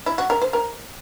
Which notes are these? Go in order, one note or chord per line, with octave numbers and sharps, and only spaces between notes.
E4
F#4
A#4
C5
A#4